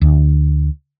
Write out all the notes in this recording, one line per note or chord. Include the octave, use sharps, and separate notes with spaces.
D2